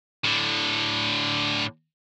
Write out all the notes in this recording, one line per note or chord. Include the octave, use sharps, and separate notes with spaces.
A2 D3